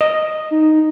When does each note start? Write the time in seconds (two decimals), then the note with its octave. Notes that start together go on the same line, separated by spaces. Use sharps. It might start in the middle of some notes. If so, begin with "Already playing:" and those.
0.01 D#5
0.51 D#4